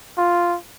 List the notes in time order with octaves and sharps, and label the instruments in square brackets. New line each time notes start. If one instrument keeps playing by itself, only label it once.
[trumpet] F4